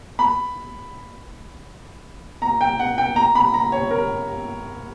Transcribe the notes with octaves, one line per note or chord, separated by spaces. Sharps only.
B5
A#5
G5
F#5
G5
A#5
B5
A#5
C#5
A#4